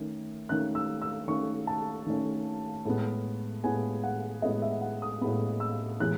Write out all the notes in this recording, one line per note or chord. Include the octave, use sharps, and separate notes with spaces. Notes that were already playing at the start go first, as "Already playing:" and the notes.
Already playing: D#3 A3 C#4
D#3 A3 C#4 F#6
E6
E6
D#3 A3 C#4 C#6
A5
D#3 A3 C#4
A2 G#3 B3
A2 G#3 B3 G#5
F#5
A2 G#3 B3 D#5
E5
F#5
D#6
A2 G#3 B3 B5
E6
A2 E3 G#3 B3 F#6